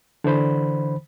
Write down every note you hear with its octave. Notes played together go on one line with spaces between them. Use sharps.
D3 E3 C5 B5